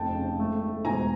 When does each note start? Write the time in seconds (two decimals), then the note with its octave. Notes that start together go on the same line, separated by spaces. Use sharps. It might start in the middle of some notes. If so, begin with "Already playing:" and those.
Already playing: F1 F2 G5 A5
0.16 C#3
0.40 A3
0.62 A3
0.85 E1 G#5 A#5